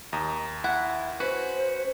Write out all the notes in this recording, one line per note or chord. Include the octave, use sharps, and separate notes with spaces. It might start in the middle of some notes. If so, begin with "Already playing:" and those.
D#2 D#4
E4 F#5
C#4 F#4 B4 C5